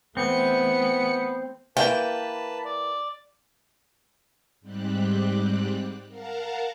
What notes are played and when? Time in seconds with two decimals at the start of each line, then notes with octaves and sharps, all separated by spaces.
0.17 E3 A3 B3 C4 C#7
1.77 E3 A3 A#3 B4 G5 A5
2.65 D5
4.61 G#2 G3 C4 G4 F#6
6.08 A#4 F5 F#5 A5 A#5